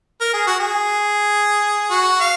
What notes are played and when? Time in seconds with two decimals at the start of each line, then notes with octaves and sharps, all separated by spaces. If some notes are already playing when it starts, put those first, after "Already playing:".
0.21 A#4
0.34 G#4
0.47 F#4
0.59 G#4
1.91 F#4
2.20 F5